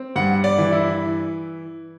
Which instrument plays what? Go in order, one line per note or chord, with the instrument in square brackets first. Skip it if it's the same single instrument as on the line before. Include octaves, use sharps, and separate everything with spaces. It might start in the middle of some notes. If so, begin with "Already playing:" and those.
Already playing: [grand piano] C4
G2 F#5
D5
E3
E4